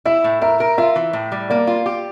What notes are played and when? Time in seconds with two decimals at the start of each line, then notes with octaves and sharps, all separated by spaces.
0.05 E4 E5
0.24 A2
0.42 A#4 E5
0.60 A#4
0.78 F4 E5
0.96 E3
1.13 A2
1.32 G3
1.50 A#3 D5
1.67 F4
1.86 G4